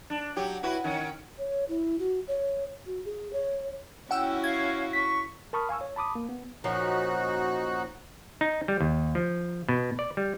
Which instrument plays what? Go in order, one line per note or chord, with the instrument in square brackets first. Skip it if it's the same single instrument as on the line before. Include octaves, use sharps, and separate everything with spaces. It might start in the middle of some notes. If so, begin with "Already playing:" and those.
[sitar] D4
F#3 G4
E4 F#4 B4
D#3 C#4
[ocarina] C#5
E4
F#4
C#5
F#4
G#4
C#5
[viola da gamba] C#4 E4 F#4 [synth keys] F#5 G5 E6
[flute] F5 [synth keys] G#6
[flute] C#6 [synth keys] B6
[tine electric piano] A#4 A5 B5 C#6 D#6 F6
F5 G#5 C#6 E6
C#5
A5 B5 D6 D#6
A#3
B3
[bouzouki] A#2 F3 C#4 [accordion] D#4 F#4 F#6
[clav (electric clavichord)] D#4
G3
D#2
F3
B2
D5
G3